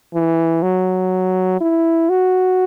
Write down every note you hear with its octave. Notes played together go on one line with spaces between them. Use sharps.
E3
F#3
E4
F#4